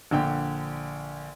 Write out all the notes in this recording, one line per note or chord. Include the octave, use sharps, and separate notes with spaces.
A#1 D3 G5